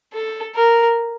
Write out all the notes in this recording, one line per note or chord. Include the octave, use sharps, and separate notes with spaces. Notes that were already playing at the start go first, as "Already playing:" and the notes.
A4
A#4